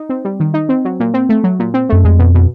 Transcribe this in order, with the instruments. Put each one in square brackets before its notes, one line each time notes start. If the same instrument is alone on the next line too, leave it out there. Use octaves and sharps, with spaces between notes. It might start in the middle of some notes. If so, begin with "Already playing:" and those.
Already playing: [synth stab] D#4
C4
G3
D#3
D#4
C4
F#3
A#2
C4
A3
F#3
A#2
C4
[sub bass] F#2 [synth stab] A3
[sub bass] F2 [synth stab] G#3
[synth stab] B2
B2